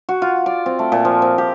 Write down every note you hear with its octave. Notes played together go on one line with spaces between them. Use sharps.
F#4
F4
D5
C4
A3
A#2
F3
C4
G4